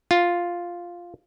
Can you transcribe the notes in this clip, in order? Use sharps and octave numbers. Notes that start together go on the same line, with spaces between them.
F4